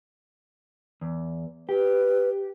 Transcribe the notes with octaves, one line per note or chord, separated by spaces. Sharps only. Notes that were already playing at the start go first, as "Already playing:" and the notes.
E2
G4 B4